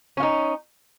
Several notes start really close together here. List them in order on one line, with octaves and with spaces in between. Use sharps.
C#4 F4 D#4